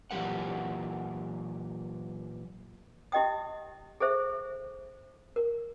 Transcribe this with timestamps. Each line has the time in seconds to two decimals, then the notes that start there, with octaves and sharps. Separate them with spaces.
0.11 A#2 E3 F#3 G4 A#4 F#5
3.12 E4 G4 D#5 G5 D#6
4.00 G#4 A4 C5 E5
5.36 A#4